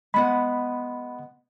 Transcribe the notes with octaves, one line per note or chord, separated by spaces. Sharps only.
G#3 B3 F#5 B5